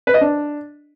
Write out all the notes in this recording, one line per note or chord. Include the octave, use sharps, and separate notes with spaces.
B4
D#5
D4